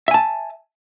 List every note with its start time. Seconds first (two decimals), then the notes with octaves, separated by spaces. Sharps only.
0.08 E5
0.11 G#5
0.14 A5